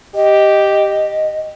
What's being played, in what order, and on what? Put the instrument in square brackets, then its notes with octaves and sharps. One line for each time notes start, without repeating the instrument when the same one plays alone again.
[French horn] G4 [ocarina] D#5